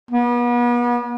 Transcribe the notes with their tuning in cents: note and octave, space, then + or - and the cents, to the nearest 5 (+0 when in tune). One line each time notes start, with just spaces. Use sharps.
B3 -35